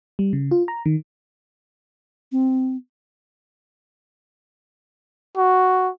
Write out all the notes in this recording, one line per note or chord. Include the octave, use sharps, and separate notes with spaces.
G3
C#3
F4
A#5
D#3
C4
F#4